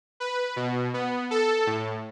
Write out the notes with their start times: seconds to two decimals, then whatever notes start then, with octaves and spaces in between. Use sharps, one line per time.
0.20 B4
0.56 B2
0.94 B3
1.31 A4
1.67 A2